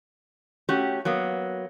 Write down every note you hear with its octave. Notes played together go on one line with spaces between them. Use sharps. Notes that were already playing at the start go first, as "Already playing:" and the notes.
A3 C#4 F#4 G4
F#3 A#3 B3